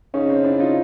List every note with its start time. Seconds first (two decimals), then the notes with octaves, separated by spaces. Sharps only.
0.14 C#3 C#4 D#4
0.29 C4 D4
0.44 D4 E4
0.60 D#4 F4